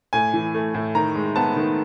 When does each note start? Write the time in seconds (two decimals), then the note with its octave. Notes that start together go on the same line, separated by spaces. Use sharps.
0.13 A2 G#5
0.34 E3
0.55 A3
0.75 A2
0.95 D#3 A#5
1.15 G#3
1.36 B3 A5
1.56 D#3